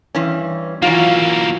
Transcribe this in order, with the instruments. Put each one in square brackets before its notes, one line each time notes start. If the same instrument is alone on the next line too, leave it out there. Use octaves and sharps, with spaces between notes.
[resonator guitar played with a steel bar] G2 E3 C#4
[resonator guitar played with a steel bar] E3 F#3 F4 [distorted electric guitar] A#3 C#4